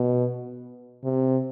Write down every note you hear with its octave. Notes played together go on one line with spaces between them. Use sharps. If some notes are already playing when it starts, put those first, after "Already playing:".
Already playing: B2
C3